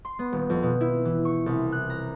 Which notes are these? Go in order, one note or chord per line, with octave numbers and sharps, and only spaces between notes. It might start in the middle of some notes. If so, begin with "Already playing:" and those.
C6
B3
D#1
F2
B2
E4
E3
C#6
C2
F#6
A#5